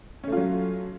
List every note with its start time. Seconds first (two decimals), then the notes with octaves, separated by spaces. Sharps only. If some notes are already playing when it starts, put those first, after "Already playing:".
0.24 C#4
0.28 A3
0.32 F4
0.37 F#3